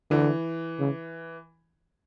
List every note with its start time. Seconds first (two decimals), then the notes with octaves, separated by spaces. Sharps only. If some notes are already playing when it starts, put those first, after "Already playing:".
0.10 D3 E3
0.79 C#3